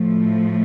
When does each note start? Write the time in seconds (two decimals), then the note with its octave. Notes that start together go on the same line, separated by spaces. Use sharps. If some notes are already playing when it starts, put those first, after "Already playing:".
Already playing: A2 F3 A3